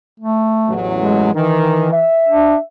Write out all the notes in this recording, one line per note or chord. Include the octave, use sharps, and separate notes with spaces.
A3
A1 E2 F#3
G#3
D#3 E3
E5
D4